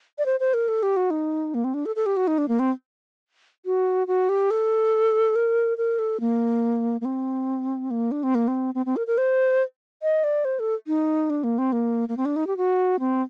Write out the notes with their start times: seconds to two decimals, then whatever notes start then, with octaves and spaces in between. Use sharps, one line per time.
0.18 D5
0.26 C5
0.40 C5
0.54 A#4
0.68 A4
0.83 G4
0.97 F#4
1.10 D#4
1.54 A#3
1.64 C4
1.74 D4
1.86 A4
1.96 A4
2.06 G4
2.17 F#4
2.27 D#4
2.38 D4
2.48 A#3
2.59 C4
3.66 F#4
4.07 F#4
4.29 G4
4.51 A4
5.36 A#4
5.78 A#4
5.99 A4
6.20 A#3
7.01 A#3
7.05 C4
7.91 A#3
8.11 D4
8.23 C4
8.35 A#3
8.48 C4
8.75 C4
8.86 C4
8.96 A#4
9.07 A#4
9.18 C5
10.03 D#5
10.24 D5
10.45 C5
10.60 A4
10.87 D#4
11.30 D4
11.44 A#3
11.58 C4
11.72 A#3
12.09 A#3
12.17 C4
12.25 D4
12.36 D#4
12.47 G4
12.57 F#4
13.00 C4